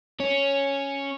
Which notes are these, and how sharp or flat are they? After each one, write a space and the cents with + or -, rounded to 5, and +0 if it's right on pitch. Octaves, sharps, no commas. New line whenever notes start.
C#4 +0 C#5 +0